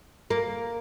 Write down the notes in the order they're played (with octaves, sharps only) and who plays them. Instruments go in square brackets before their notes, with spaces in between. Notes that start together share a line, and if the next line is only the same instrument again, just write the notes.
[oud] A#3